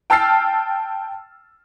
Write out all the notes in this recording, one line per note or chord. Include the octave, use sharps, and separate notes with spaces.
G5 A5 E6 F6 A6 C7